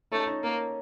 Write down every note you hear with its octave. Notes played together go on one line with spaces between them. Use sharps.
A3 C#4 D#4
C#4 D#4
A#3